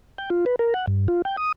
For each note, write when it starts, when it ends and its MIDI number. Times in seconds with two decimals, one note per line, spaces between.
0.18 0.30 79
0.30 0.45 65
0.46 0.56 71
0.59 0.74 70
0.74 0.86 78
0.87 1.08 43
1.08 1.22 65
1.25 1.36 79
1.37 1.52 87